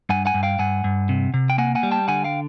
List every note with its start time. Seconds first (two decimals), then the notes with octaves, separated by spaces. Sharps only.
0.09 G2 F#5 G#5
0.26 F#5 G#5
0.34 G2
0.43 F5 G5
0.59 G2 F#5 G#5
0.84 G2
1.09 C3
1.34 C3
1.50 G5
1.58 A#3 F#5 G#5
1.75 F#5 G#5
1.83 G3
1.91 G5 A5
2.08 D3 F#5 G#5
2.24 F5 G5